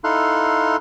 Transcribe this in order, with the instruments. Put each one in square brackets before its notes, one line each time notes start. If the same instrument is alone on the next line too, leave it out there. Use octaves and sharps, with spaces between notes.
[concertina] D#4 E4 A4 F5 C6 F#6